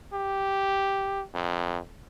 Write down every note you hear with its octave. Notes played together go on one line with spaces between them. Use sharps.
G4
F2